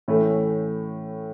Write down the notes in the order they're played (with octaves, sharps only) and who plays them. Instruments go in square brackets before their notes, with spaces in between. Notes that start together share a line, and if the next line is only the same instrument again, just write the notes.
[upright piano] A2 E3 A3 C#4